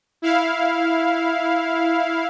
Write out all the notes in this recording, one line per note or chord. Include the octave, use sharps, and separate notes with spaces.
E4 F5